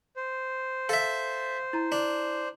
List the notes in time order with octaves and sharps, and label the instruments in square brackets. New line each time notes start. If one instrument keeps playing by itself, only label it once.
[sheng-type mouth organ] C5
[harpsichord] A4 E5 [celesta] F5
[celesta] E4 A#5
[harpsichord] D4